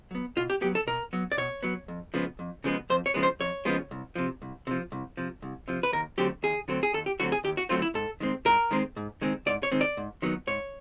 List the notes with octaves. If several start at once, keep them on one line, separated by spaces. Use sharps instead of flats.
F#3 B3
B2 F4
G4
F#3 B3 G4
A4
B2 A#4
F#3 B3
D5
B2 C#5
F#3 B3
F2
C#3 F3 G#3 B3
F2
C#3 F3 G#3 B3
F2 C5
C#5
C#3 F3 G#3 B3
C5
F2 C#5
C#3 F3 G#3 B3
C2
C3 F3
C2
C3 F3
C2
C3 F3
C2
C3 F3
B4
D#2 A#4
D3 F#3 A3 C4 G4
D#2 G#4
D3 F#3 A3 C4
G#4
D#2 A4
G4
D3 F#3 A3 C4 F#4
G#4
D#2 G4
F#4
D3 F#3 A3 C4 F4
E4
G#2 A4
D#3 G#3 C4
G#2 A#4
D#3 G#3 C4
G#2
D#3 G#3 C4
G#2 D5
C#5
D#3 G#3 C4
D5
G#2
D#3 F#3 B3
G#2 C#5